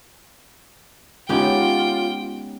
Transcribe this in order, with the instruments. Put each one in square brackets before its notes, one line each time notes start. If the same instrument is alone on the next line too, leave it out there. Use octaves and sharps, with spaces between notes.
[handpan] G#3 C#4 D#4 [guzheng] B3 G4 G#5 [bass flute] F4 [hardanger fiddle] G5